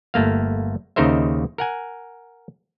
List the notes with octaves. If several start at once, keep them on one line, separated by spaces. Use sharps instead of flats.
G1 A3 A#3 F5
D#2 C#3 D#4 A#4 C5 E5
A#4 F#5 G#5